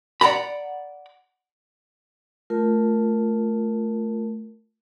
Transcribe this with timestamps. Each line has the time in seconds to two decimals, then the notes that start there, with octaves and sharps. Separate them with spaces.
0.21 D5 F#5 A#5 B5
2.50 A3 F4 A#4